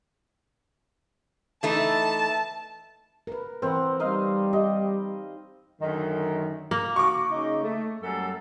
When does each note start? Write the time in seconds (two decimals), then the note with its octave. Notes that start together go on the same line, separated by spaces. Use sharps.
1.63 E3 A3 D#4 A5
3.27 A#4 B4
3.62 E3 C4 A#4 B4 F#5
4.00 G3 D#4 D#5 F5
4.53 G4 D#5
5.82 F#2 D3 D#3
6.71 A#3
6.96 F#4 C#6 D6
7.30 C#3 D#4
7.63 A3
8.02 F#2 G3 A4